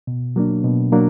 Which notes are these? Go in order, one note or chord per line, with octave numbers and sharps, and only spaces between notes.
B2
F#3 A#3 D4
B2
F#3 A#3 D4